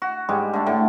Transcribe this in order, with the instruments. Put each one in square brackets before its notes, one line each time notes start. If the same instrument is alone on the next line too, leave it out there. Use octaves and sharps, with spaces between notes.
[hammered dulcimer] F#4
G#2 G3 G#3 G4
D3 A3
A2 D3 G5